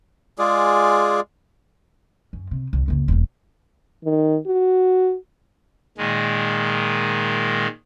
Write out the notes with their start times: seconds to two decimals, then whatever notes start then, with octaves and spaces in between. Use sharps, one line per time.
0.39 G#3 F4 G#4 D5
2.33 F#2
2.51 C3
2.73 C2
2.88 F#1 C#2
3.08 E1 F2
4.05 D#3
4.47 F#4
5.98 A#2 D#3 G#3